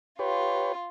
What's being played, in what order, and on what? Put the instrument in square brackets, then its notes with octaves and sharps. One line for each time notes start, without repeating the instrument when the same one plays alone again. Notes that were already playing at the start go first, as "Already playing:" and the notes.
[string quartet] F4 [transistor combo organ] G4 B4 C#5